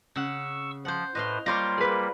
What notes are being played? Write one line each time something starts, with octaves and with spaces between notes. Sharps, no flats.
C#3 F#5 C#6 E6
F3 C5 F#5
A2 B4 C5 D#5 F5 C6
G3 A#3 F4 C5 C#5 C6 D6 A#6
G#4 B4